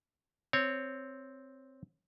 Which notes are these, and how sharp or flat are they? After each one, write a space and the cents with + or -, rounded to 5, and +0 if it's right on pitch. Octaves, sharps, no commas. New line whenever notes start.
C4 +0 C#5 +0